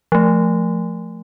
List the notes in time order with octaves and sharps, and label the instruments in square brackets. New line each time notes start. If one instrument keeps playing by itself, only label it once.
[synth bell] F3 A3